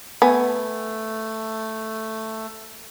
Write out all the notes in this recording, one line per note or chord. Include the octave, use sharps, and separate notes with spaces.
A3 B3 G#5